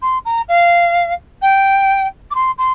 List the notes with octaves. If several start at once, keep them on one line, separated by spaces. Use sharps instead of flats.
C6
A#5
F5
G5
D6
C6
C6